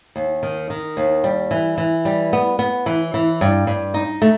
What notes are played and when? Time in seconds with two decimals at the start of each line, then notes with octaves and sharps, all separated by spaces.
0.16 D#2
0.43 D#3
0.70 D#3
0.97 D#2
1.24 G3
1.51 E3
1.78 E3
2.05 G3
2.33 B3
2.59 B3
2.86 E3
3.14 E3
3.41 G2
3.67 G2
3.94 D#4
4.22 A3